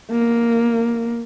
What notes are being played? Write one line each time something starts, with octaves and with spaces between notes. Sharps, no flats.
A#3